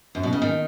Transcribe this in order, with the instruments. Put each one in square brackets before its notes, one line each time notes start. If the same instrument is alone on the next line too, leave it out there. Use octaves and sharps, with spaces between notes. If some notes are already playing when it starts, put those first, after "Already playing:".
[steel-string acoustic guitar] F#2
B2
C#3
D#3